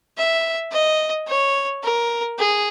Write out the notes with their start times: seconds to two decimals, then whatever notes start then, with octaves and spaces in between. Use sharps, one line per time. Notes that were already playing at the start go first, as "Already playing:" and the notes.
0.17 E5
0.72 D#5
1.28 C#5
1.83 A#4
2.39 G#4